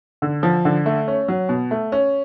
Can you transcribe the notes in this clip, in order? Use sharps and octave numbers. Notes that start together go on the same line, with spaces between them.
D3
F3
D3
A3
C#4
F#3
B2
A3
C#4